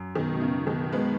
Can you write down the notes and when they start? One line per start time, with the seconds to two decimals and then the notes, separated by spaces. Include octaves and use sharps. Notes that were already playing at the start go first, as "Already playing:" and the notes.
Already playing: F#2
0.15 B2 D#3
0.34 B2
0.41 C#3
0.67 B2 D#3
0.92 G#3 B3